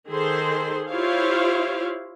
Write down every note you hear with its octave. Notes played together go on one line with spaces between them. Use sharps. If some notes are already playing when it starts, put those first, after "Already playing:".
D#3 G#4 A4 C5 C6
E4 F4 G4 C5 C#5 F5